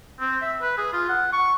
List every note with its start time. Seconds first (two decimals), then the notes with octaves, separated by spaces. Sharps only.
0.20 C4
0.42 E5
0.62 B4
0.78 G#4
0.93 F4
1.09 F#5
1.33 C#6